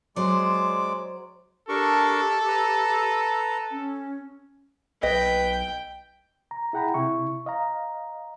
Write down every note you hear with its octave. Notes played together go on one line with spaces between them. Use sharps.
F#3 G#3 C5 D5 D6
D4 G4 A4 A#4 C#6
B4 A#5
C#4
B1 B4 D#5 G5
A#5
E4 G#4 F#5 G5 A#5 B5
C3 E4 C#6
D#5 F5 A#5